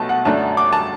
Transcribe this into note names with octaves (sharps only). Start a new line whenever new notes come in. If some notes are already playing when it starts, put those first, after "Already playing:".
Already playing: B1 B2 A3 A5
F#5
F#2 D3 A3 D4 A5
D6
A5